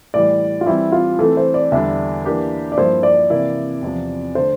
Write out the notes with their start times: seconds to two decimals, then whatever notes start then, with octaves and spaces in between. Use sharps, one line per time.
0.14 A2 E3 G3 D5
0.61 F4
0.66 E3 G3 C4 E4
0.92 F4
1.19 E3 A3 C4 A4
1.37 C5
1.54 D5
1.72 E2 D3 G3 D4 E5
2.24 E3 A#3 D4 G4 A#4
2.72 D5
2.77 G2 F3 A#3 E4 C5
3.03 D5
3.30 C3 E3 A#3 E4
3.82 E2 C3 F3
4.35 D3 A3 C5